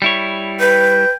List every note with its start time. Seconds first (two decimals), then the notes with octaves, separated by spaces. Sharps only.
0.02 G3 E4 C#5
0.60 B4 G5